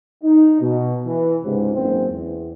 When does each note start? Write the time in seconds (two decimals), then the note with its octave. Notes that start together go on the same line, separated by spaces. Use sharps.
0.23 D#4
0.60 B2
1.06 E3
1.44 C#2 G#2 C3
1.74 F#1 G#2 C4
2.10 E2